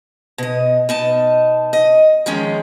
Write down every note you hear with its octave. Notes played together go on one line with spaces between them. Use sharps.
B2 D#5
B2 D#4 A5
D#5
D#3 F3 G#3 C#4